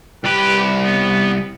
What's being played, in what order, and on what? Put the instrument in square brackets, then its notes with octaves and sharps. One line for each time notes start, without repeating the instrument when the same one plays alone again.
[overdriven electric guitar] C2 B5 [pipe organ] G4 B4 G5
[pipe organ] B3